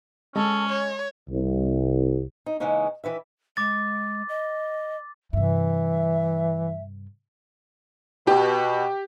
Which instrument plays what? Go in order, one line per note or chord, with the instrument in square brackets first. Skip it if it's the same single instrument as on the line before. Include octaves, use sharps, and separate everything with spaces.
[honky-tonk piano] G#3 [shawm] C#4 [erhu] A4
[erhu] C#5
[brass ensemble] C2
[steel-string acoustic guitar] D#4
C#3 E3 G#3 A#3 C#4 D#4
D#3 E3 B4 E5
[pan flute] G#3 [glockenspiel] D6 A6
[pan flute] D#5
[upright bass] G2 C3 [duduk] E3 [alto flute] E5
[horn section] B2 [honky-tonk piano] G4